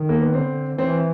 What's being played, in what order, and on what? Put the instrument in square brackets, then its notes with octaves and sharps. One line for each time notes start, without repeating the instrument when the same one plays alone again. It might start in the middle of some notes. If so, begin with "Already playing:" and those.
Already playing: [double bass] D#3
[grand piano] A#3
B3
[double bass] D3 [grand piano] C4
[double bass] E3 [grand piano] C4